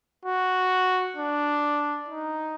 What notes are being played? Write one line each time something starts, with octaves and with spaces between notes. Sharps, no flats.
F#4
D4
D#4